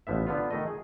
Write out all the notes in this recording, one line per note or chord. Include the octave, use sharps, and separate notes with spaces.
A1 F3 B3 E5
D3 B3 F4
D#3 A3 D#5
G#4